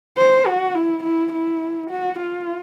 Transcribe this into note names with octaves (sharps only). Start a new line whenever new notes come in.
C5
F#4
E4
E4
E4
F#4
F4